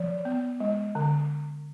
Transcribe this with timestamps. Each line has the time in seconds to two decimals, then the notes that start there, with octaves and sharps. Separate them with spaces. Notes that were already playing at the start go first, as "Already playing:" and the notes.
Already playing: F3 C#5
0.25 B3
0.60 G#3
0.95 D3